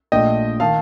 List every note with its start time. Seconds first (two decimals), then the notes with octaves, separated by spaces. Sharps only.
0.12 A#1 A#2 A3 D4 D#5 G5
0.60 D#3 F5 A5